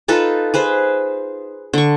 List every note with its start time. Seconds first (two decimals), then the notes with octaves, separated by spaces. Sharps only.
0.08 D#4 F4 A4 B4
0.54 G#4 B4 C5
1.74 D3 C#6